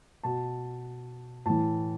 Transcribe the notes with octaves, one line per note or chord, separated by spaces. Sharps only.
B2 A5
A2 E3 A5